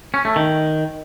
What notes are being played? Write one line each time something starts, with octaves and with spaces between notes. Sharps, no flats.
C#4
A3
D#3